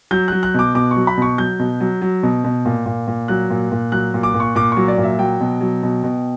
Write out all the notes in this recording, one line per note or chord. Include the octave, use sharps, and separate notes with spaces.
F#3 G6
F#3 F#6
F#6
B2 D6
B2 D6
F#3 C#6
B5
B2 C#6
F#3 G6
B2
F#3
F#3
B2
B2
A#2
A#2
A#2
F#3 F#6
A#2
A#2
F#3 F#6
A#2
D6
A#2
C#6
A#2 D6
F#3 C#6
D5
A#2
E5
F#3 G5
B2
F#3
B2
B2